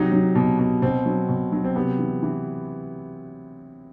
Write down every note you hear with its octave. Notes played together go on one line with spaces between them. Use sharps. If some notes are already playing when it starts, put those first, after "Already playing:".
Already playing: C3 F#3 D#4
F#3
B2
B2
B2 C4
F#3
B2
F#3
C4
C3 B3
E3
E3